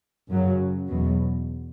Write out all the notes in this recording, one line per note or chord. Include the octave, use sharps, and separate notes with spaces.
F#2 C#3 F#3
E2 B2 F#3